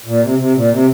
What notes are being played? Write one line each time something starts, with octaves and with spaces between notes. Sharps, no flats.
A#2
C3
C3
A#2
C3